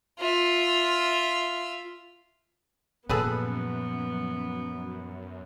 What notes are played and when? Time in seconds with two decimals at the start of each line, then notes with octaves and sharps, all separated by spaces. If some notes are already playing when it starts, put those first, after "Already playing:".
0.19 F4 E5
3.09 F#2 A#2 F3 B3 G#4 A4 B4